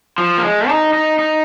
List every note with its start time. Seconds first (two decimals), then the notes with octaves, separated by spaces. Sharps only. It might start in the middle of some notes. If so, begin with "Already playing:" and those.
0.18 F3
0.38 A#3
0.43 G#3
0.69 D#4
0.93 D#4
1.19 D#4